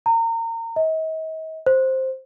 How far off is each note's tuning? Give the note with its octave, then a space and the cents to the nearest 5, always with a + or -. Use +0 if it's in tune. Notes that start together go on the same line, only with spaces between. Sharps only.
A#5 -30
D#5 +40
C5 +5